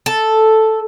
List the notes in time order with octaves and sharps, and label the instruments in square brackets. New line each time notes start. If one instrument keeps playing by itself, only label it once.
[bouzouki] A4